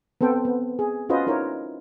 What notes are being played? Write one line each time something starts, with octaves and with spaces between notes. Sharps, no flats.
B3 C4 A4 C5 G5
B3
G#4
C#4 F4 F#4 B4 C5 D#5
D#4 E4 A#4 C5 C#5